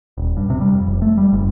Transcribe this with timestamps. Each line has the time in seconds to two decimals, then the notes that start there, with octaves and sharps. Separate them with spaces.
0.18 D#1
0.37 G2
0.50 C3
0.61 G3
0.74 F2
0.87 F1
1.02 A3
1.17 G3
1.33 F#1